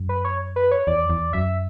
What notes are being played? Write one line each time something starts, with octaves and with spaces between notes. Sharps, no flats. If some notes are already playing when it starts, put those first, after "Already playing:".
Already playing: F#2
B4
C#5
B4
C#5
E2 D5
E2
F#2 E5